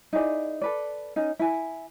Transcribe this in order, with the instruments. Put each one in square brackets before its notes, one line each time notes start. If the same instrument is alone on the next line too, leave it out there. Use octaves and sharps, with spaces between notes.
[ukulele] D#4 E4 G#4 D5
A4 B4 D5
C#4 D#4
E4 G#5